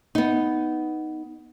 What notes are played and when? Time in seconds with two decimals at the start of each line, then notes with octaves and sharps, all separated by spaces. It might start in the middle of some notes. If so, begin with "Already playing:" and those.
0.15 B3 D#4